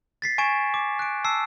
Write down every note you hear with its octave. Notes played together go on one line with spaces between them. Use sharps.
A6 B6 C7
G#5 C#6 G#6 D7 E7
D6
F#6 D7
A5 E6 C7